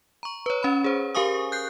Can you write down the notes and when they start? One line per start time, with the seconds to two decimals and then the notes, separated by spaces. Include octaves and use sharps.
0.23 A#5 C#6
0.46 B4 C#5
0.63 C#4 B5
0.84 G#4 C5
1.15 G4 A#4 F5 G#5 C#6 D#6
1.52 F#6 G6 C7